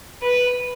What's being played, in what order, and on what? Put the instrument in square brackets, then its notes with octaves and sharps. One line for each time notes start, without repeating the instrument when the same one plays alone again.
[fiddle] B4